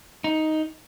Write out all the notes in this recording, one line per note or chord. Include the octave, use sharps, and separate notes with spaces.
D#4